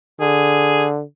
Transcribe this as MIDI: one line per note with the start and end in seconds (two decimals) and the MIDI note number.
0.20 1.02 50
0.20 0.85 68